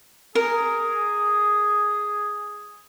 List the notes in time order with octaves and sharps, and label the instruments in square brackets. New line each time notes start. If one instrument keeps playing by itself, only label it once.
[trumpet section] G#4 [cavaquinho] A#4